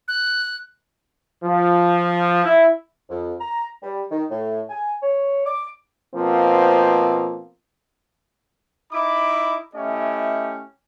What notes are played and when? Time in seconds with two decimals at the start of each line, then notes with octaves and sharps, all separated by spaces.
0.08 F#6
1.44 F3
2.45 E4
3.09 F2
3.40 A#5
3.82 G3
4.11 D#3
4.30 A2
4.69 G#5
5.03 C#5
5.45 D6
6.15 B2 F3 A#3 C4
8.92 D#4 E4 B5 D6
9.74 A3 C#4 E4 G4 D#5